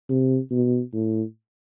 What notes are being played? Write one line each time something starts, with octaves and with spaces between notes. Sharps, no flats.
C3
B2
A2